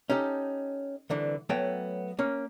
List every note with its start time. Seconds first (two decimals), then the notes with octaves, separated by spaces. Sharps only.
0.10 C#4 D#4 G4 A4
1.10 C2 D3 E3
1.49 F#3 A3 B3 F#4 C#5 G5
2.19 A#3 C#4